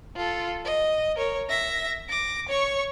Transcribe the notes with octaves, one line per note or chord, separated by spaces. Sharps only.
F4 A4
D#5
A#4 C#5
E5 A#6
D6 A#6
C#5 C#6